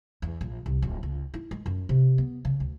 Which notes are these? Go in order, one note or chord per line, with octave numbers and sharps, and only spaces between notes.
E2
A#1
C2
D1
C#2
E4
G#3
F#2
C3
B3
C#3
D2